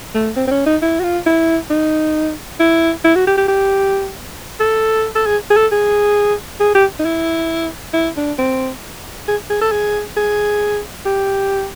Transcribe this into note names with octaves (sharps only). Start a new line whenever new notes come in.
A3
C4
C4
C#4
D#4
E4
F#4
F4
E4
D#4
E4
E4
F#4
G4
G4
G4
A4
A4
G#4
G#4
A4
G#4
G#4
G4
D#4
E4
E4
D4
C4
G#4
G#4
A4
G#4
G#4
G4